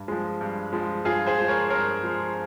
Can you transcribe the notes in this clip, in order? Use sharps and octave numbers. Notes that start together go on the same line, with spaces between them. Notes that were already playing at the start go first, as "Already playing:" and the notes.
Already playing: G2
F3 G#3
G2
F3 G#3
G2 F4 G#4
G#4 C5
F3 G#3
A#4 C#5
G2 A#4 C#5
F3 G#3